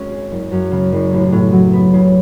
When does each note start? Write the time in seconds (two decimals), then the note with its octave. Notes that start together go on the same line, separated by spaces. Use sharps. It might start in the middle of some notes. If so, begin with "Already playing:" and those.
Already playing: G#1 G#3 C#4
0.11 G#4
0.31 F#1
0.52 F#2
0.72 C#3
0.92 F#1
1.13 A1
1.32 A2
1.52 F#3
1.73 B3
1.93 C#3